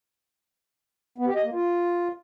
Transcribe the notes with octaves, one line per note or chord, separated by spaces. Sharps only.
B3
G4
D#5
A#3
F4